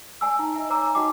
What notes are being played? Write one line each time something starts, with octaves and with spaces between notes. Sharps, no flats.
D5 G#5 E6
D#4 E4
D#5 E5 G#5
C#5 D5 G#5 A#5 D6 E6
D#4 F#4 D#5 G5 D6